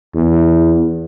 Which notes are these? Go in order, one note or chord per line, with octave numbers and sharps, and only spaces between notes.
E2